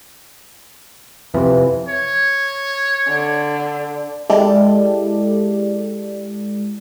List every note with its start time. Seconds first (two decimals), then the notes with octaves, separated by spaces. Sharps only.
1.34 F2 C3 E3
1.88 C#5
3.08 D3
4.30 G#3 E4 G4 A4 D5